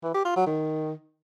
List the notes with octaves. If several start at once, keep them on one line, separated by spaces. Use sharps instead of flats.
E3
G4
F4
F#3
D#3